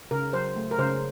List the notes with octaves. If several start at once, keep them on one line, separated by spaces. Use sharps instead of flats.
C#3 A#4
F#3 C5
A3
A#4
C#3 C5